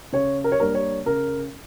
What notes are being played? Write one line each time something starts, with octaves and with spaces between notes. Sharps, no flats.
C#3 C#5
A#4
C#5
G3 A#3 D4 A#4
C#5
C#3 A#4